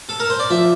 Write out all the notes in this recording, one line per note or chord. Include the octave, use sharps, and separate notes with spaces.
A4
A#4
C5
D5
F3 E5